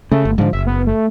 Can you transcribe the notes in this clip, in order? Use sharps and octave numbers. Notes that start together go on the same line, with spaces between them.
C#3 A3
G1
G#2 D3 F3
F#1 E5
B3
A3